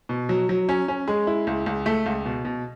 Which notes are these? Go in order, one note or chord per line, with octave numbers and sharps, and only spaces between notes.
B2
F#3
F#3
C#4
C#4
G#3
E4
C#2
C#2
A3
C#2
B2
B2